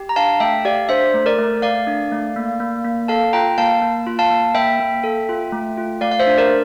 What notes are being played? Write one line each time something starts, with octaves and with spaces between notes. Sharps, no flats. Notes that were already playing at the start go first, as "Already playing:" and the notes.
Already playing: G4
A#5
D4 F5 A5
A3 E5 G5
G4 D5 F5
D4 C5 E5
A3
A#4 D5
A3
A3 D5 F5
D4
A3
A#3
A#3
A#3
A4 F5 A5
F4 G5 A#5
A#3 F5 A5
A#3
F4
F5 A5
A#3
A#3 E5 G5
A#3
A4
F4
A3
F4
A3 D5 F5
F5
C5 E5
D4
A#4 D5